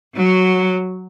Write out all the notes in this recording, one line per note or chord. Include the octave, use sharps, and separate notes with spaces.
F#3